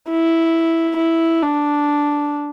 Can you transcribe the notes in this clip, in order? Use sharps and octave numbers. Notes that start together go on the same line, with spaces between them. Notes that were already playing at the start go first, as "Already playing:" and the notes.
E4
E4
D4